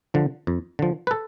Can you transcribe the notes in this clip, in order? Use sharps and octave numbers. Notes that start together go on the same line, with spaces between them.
D3 F3
F2
D3 F3
B4
A4